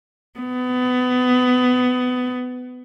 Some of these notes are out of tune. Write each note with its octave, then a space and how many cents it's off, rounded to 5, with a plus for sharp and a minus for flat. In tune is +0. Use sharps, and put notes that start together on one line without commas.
B3 +25